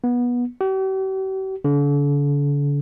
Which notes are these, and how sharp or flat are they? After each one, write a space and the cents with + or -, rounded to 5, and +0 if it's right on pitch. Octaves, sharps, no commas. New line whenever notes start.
B3 -20
G4 -45
D3 -40